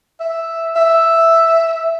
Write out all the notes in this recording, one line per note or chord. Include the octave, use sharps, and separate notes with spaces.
E5
E5